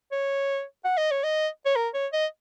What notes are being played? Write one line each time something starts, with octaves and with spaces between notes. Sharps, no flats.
C#5
F#5
D#5
C#5
D#5
C#5
A#4
C#5
D#5